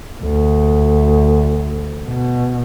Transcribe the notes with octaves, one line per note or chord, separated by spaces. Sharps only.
D2
B2